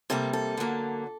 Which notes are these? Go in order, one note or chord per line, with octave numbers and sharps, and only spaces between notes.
C3 G3 A#3 A4
A4
D3 F#3 A#3